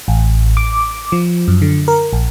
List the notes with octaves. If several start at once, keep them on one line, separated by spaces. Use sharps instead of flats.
A1
D6
F3
F#2
D3
A#4
A#1